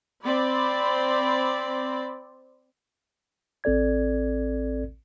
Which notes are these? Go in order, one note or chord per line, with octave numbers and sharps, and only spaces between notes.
C4 D5 B5
A1 C4 A4 D5 G#6